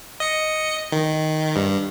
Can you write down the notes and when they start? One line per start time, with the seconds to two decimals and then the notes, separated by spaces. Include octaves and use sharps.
0.20 D#5 C#7
0.92 D#3
1.56 G2